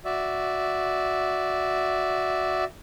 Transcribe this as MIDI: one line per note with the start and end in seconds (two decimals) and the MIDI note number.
0.05 2.64 66
0.05 2.64 74
0.05 2.64 76